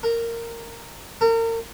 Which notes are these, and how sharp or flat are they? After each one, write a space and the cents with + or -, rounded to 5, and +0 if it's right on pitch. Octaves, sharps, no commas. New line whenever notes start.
A#4 -10
A#4 -35